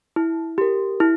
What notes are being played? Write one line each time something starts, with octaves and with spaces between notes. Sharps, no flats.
E4
G4 A#4
E4